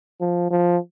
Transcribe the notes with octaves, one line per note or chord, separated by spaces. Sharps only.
F3
F3